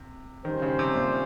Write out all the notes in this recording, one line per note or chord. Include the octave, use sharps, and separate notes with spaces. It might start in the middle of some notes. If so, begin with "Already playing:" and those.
Already playing: C3
D#3 G3 C#4 G4 C5
C#3
C3
A#2